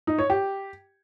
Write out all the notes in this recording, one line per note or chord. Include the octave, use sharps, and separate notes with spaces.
D#4
C#5
G4